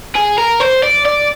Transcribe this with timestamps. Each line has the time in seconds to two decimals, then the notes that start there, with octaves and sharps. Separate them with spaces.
0.15 G#4
0.38 A#4
0.60 C5
0.83 D5
1.06 D5